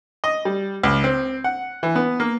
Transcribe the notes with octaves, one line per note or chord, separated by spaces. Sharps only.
D#5
G3
C#2
C4
F#5
E3
B3
A#3